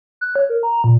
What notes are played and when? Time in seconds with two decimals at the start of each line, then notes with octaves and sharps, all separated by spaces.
0.21 F#6
0.35 C#5
0.50 A#4
0.63 A#5
0.84 A#2